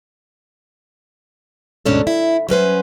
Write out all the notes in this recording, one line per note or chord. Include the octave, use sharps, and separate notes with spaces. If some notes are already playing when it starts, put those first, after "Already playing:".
D2 G#2 B2 C#4 D4 A4
E4
F#3 C#4 B4 C5